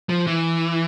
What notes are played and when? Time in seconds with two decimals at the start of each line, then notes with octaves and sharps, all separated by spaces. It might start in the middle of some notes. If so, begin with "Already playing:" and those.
0.09 F3
0.27 E3